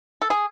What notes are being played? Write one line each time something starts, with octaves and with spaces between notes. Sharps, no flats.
A4
G#4